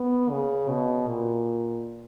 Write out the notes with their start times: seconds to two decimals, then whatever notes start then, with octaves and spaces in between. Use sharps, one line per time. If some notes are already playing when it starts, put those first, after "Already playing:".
Already playing: B3
0.30 C#3
0.69 B2
1.08 A#2